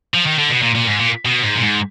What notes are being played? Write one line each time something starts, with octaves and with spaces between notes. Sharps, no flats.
F3
D#3
D3
B2
A#2
A#2
G#2
A#2
B2
G#2
A#2
G#2